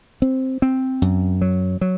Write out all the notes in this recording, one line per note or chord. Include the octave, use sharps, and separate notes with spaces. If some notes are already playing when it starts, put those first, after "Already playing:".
C4
C4
F#2
F#3
F#3